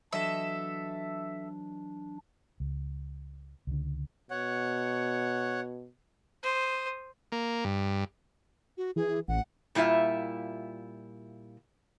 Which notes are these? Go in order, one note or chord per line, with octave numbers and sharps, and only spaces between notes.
E3 F#3 D4 A4 D#5 E5
C#2
C#2 D3
B2 C#5 F#5
C5 D#6
A#3
G2
F#4
E3 G#4
A1 F#5
A#2 G3 E4 F4 E5